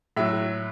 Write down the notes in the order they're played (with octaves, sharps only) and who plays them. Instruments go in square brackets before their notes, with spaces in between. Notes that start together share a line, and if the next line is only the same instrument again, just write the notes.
[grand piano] A2 F#3 E5